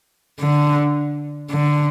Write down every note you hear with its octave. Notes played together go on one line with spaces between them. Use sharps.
D3
D3